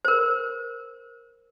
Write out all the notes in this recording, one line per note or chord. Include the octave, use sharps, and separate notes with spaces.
A#4 C5